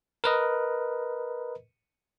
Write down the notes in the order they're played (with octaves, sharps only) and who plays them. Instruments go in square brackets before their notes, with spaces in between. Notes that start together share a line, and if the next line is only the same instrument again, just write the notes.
[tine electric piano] A#4 B4 D#5